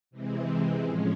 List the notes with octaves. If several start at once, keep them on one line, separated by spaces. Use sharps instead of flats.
C3 E3 G#3 C4
A2 F3 G#3 C#4